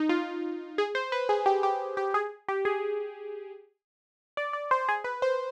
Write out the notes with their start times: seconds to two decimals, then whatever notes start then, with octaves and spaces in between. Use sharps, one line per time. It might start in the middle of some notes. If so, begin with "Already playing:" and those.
Already playing: D#4
0.09 F4
0.78 G#4
0.95 C5
1.12 B4
1.29 G#4
1.46 G4
1.63 G4
1.97 G4
2.14 G#4
2.48 G4
2.65 G#4
4.37 D5
4.53 D5
4.71 C5
4.89 G#4
5.04 B4
5.22 C5